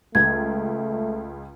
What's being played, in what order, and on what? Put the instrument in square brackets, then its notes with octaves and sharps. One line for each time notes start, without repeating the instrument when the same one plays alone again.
[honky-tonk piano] C#2 [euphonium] A3 [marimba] G#6